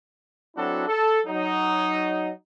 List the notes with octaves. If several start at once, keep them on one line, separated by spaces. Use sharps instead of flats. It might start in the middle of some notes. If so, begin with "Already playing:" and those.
F#3 C4 D4 E4 F#4 A4
A4
F#3 D#4